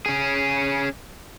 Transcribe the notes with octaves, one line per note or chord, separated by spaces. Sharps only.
C#4 G#4